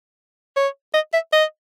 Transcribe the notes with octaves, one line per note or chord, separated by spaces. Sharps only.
C#5
D#5
E5
D#5